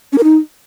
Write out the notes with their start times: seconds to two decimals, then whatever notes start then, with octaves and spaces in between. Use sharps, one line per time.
0.12 C#4
0.18 A#4
0.24 D#4